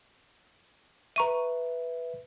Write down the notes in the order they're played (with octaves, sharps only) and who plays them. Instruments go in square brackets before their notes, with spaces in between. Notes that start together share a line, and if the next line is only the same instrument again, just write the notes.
[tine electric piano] B4 E5 [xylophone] A#5 C#6 D#7